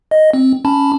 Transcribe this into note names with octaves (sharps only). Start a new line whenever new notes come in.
D#5
C4
C#4 A5 B5